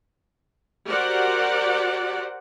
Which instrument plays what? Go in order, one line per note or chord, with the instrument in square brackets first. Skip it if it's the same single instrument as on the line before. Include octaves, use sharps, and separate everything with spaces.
[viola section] F#4 G4 A#4 C5 D5 F#5